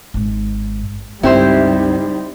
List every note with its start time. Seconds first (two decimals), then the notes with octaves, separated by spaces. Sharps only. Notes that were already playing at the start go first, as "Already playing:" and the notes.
0.14 G#1 G#2
1.23 C#2 G2 G3 C4 D#4 E4 G4 C5